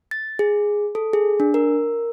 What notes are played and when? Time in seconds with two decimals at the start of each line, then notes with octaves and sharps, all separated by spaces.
0.11 A6
0.39 G#4
0.95 A4
1.13 G#4
1.40 D4
1.54 A#4